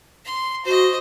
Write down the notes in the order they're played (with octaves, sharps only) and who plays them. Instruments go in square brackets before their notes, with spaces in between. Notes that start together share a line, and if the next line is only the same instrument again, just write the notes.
[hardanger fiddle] C6
[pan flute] F#4 [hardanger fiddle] C5 D#5